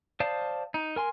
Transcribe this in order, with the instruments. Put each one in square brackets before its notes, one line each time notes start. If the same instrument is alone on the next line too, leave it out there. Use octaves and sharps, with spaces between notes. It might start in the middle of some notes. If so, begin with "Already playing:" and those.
[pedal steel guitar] C5 D5 F5 A5 D#6
D#4
A#4 G#5 C6